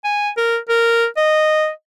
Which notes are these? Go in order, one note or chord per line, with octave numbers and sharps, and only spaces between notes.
G#5
A#4
A#4
D#5